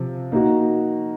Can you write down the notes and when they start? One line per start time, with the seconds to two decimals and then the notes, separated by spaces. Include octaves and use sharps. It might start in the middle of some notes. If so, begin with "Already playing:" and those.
Already playing: C3 F3 C4
0.32 A#3 D#4 F#4